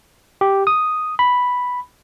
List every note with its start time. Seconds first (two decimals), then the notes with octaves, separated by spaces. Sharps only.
0.41 G4
0.67 D#6
1.19 B5